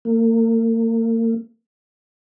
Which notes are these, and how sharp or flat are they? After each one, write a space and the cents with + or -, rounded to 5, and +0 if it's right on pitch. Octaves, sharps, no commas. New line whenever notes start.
A#3 -40